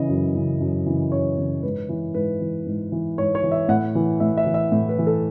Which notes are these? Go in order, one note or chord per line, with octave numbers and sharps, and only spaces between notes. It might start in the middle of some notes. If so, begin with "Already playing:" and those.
Already playing: C#3 E3 D#5
F#2
C#3 E3
F#2
C#3 E3
F#2 C#5
C#3 E3
G#2 B4
E3
G#2 B4
E3
G#2
E3
G#2 C#5
C#5
E3
E5
A2 F#5
E3
A2 E5
E5
E3
E5
A2
B4
E3
A4